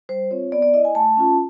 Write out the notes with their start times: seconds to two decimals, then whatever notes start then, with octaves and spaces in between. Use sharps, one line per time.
0.09 G3 C5
0.31 C4 F4 C#5
0.52 B3 D5
0.62 D5
0.74 E4 D#5
0.85 G#5
0.95 A3 A5
1.17 C#4 F4